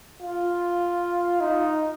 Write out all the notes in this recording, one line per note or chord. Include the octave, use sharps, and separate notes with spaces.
F4
D#4